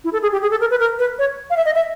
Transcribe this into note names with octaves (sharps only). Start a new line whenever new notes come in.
E4
A4
G#4
G4
G#4
A4
A#4
B4
A#4
B4
C#5
F5
E5
D#5
E5